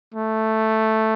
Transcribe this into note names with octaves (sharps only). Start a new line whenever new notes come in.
A3